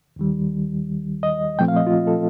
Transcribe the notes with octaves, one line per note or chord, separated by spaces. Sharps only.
D#2 D#3 G3
D#5
A#2 F3 A3 C4 G5
F5
D#5
F4
A4